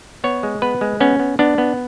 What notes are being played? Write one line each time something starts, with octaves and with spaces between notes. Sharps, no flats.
B3 C#5
G#3
B3 B4
G#3
B3 C#4
B3
B3 D4
B3